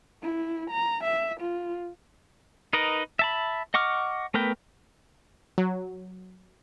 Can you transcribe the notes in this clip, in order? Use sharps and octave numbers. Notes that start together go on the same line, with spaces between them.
E4
A#5
E5
F4
D#4 A#4 B4 D#5
E5 A5 B5
D#5 F#5 C#6 D6 F6
A3 B3 A#4 B4 G5
F#3